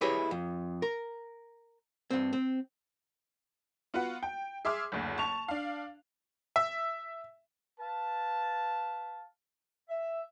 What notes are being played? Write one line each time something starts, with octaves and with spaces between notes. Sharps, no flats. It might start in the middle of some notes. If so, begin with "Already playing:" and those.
E4 G4 G#4 B4 C#5 D#5
F2
A#4
G2 C4
C4
B3 F4 F#4 B4 F#5
G5
G#4 E5 C6 D6 F6
F#1 D2
A5 C#6 F7
D4 F5
E5
B4 F5 A5
E5